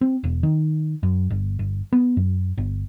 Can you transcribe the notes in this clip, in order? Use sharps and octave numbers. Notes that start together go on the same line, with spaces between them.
C4
E1
D#3
F#2
G1
G1
B3
F#2
G1